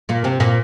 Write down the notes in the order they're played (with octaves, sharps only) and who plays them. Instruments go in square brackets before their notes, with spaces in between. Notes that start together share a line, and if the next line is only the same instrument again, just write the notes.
[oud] A#2 A#3
C3 C4
A#2 A#3